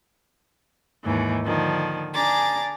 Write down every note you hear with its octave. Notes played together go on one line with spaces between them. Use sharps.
D#2 G#2 E3
D3 D#3 F3
D4 G#4 A#5 D6 A6